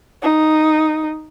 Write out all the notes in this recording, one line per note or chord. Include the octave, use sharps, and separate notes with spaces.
D#4